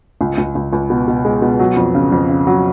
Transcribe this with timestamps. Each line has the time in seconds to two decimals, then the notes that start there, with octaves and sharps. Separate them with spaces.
0.21 C#2
0.38 C#2
0.55 C#2
0.73 C#2
0.90 B2
1.08 B2
1.25 G#3
1.42 B2
1.59 F#3
1.77 F2
1.95 C#3
2.12 F2
2.29 C#3
2.47 F#3